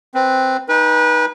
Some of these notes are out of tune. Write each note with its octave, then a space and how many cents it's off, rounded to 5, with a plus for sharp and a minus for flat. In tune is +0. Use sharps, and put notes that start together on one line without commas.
C4 +0 B4 +0
D#4 +0 B4 -25 G#5 -45